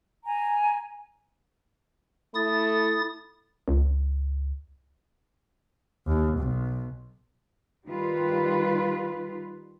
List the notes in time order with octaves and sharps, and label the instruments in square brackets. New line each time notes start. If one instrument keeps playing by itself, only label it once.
[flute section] G#5 A#5
[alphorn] A3 [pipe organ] E4 D#6 A6
[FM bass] C#2
[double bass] D#2
B1
[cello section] D#3 G3 F4 B4